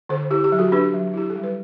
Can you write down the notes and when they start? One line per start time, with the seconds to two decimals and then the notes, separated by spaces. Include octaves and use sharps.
0.09 D3 A4 C5
0.31 E4 G4
0.44 G4
0.52 F#3
0.59 F#4 A4
0.72 D4 G4 B4
0.94 F#3
1.14 E4 G4
1.30 A4
1.36 G3
1.43 B4